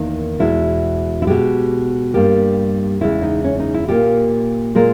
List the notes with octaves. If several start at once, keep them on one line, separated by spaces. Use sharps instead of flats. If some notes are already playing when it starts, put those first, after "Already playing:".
Already playing: E2 D#3 A#3 D#4
E2 B2 G#3 E4
E4
B2 G#3 G4
G2 G3 A#3 G4
E2 C#3 G#3 E4
D#4
C#4
D#4
E4
A#2 A#3 G4
A#2 G#3 A#4